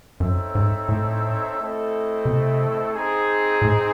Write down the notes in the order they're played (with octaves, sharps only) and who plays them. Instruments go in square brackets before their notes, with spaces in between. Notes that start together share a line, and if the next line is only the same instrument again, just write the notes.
[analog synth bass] F#2 [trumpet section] C4 D#4 A4 C#5 E5
[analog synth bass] G#2
A2
[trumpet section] A3 C4 E4 A4 D#5
[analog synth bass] C3
[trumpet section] C4 D#4 G#4
[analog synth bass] A2